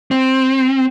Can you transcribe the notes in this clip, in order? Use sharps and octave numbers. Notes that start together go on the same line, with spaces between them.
C4